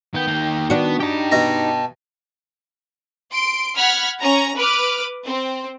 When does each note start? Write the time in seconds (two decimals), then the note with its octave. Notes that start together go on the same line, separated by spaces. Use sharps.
0.14 D#3 B3 G5
0.27 A#3 G4
0.70 B3 D4 F#4
1.00 D#4 G4 G5 A5
1.31 B2 A#5
3.32 C6 D7
3.76 F#5 B5 F6 G#6 B6
4.21 C#4 A#5
4.56 B4 D6 F6
5.25 C4